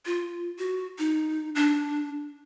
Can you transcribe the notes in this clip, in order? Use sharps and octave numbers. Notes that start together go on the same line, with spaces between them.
F4
F#4
D#4
D4